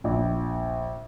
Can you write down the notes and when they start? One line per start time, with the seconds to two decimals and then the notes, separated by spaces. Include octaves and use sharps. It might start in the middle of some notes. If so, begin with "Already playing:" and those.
0.04 A#1